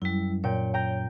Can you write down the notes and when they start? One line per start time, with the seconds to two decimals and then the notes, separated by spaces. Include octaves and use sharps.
0.02 F#2 G3 E4
0.44 A#2 C#5 G5
0.74 G5 A#5 G6